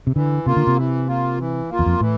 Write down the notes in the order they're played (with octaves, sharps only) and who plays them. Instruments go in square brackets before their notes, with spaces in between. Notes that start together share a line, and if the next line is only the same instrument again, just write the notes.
[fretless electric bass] C3
[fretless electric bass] D3 [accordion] E3
[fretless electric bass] C3 [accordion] A#3 F4
[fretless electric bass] D3
C3
[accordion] E3
A#3 F4
E3
A#3 F4
[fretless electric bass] E2
F2
[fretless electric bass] A2 [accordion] E3